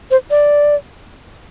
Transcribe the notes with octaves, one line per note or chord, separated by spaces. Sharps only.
C5
D5